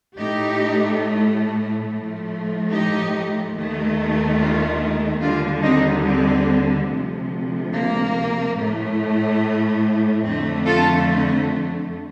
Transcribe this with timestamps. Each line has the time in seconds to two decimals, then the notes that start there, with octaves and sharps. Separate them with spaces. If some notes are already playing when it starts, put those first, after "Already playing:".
0.18 A2 A3 D#4 G4
1.86 A2 F3 A3
2.69 D#4 G4
3.54 D#2 D#3 A3
4.37 D4 F4
5.21 D#2 D3 G3 D4 F4
5.63 C4 D#4
6.05 C4
6.89 D2 C3 F3
7.72 A#3
8.56 A2 A3
10.23 F2 D3 A3 C4
10.65 F4 A4
11.08 C4